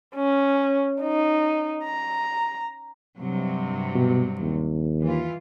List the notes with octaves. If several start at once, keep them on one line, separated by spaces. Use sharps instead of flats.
C#4
D#4
A#5
G2 C3 F#3
B2
D#2
E3 F4